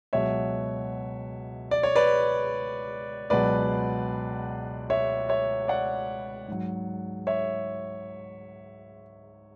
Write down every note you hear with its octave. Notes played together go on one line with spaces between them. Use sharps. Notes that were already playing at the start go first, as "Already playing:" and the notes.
C#2 B2 F#3 C#5 E5
D5
C#5
B4 D5
C#2 B2 F#3 B4 D5
C#5 E5
C#5 E5
D5 F#5
G#2 F#3
C#5 E5